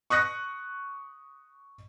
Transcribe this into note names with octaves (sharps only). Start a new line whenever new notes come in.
C#6 D#6 F#6 A#6 C#7